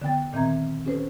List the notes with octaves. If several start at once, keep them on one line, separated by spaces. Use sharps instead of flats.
D3 B3 G5 A6
A#2 D#3 C4 E5 A#5 G#6
C#4 G4 A4 B4 C5